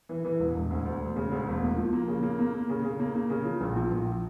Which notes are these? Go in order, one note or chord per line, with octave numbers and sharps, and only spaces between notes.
E3
E3
E1
E1
D2
D2
E1
C#3
D2
E1
A#3
F3
A#3
C#3
A#3
A#3
A#3
C#3
C#3
A#3
A#3
C#3
F3
A#1
F3
A#1